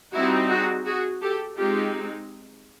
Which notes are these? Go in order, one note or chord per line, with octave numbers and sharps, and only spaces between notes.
G3 C4 D#4 E4 F#4
F#4 G#4
F#4 G#4
G4 A4
G#3 C4 D#4 F4 G4